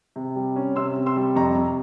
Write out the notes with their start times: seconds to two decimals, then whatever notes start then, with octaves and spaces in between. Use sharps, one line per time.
0.16 C3
0.36 G3
0.56 C#4
0.76 C3 C6 E6
0.96 C3
1.06 C6 E6
1.16 G3
1.36 F2 A#5 C#6
1.56 C3